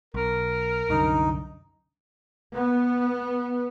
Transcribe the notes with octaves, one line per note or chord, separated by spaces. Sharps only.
B1 A#4
C2 F#2 D3 D#4
B3